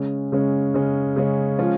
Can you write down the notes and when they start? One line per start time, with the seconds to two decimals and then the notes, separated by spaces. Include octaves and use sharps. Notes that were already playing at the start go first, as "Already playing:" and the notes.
Already playing: C#3 G#3 C#4
0.32 C#3 G#3 C#4
0.74 C#3 G#3 C#4
1.16 C#3 G#3 C#4
1.58 F3 G#3 C#4 F4